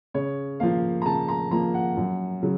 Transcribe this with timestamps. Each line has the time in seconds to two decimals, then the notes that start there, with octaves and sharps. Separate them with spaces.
0.14 C#3 C#5
0.60 F3 A#3 F5
1.02 A#5
1.06 C#3 A5
1.28 A#5
1.51 F3 A#3 A#5
1.74 F#5
1.97 F#2
2.43 C#3 F#3